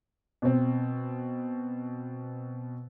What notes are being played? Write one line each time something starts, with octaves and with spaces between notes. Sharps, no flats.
B2 C4